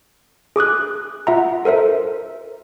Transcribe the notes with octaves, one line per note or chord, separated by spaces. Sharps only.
G#4 D6 D#6 F#6
F4 E5 F#5 A#5
A4 A#4 C5 E5